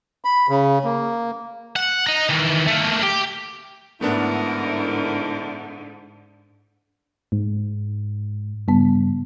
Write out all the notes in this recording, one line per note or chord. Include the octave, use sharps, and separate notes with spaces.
B5
C#3
A#3
F#5
D#5 A#5
D#3 E3
A3 A#3
G4
G#2 D3 A3 B3 D4 E4 A#4
G#2
G2 C#3 B3